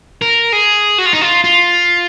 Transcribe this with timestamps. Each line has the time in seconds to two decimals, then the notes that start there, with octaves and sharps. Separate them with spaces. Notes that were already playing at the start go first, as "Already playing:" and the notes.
0.22 A#4
0.53 G#4
0.98 F#4
1.06 F4
1.13 D#4
1.21 F4
1.44 F4